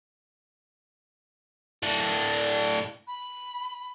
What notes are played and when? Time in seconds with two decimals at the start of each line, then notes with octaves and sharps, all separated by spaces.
1.83 A2 D4
3.07 B5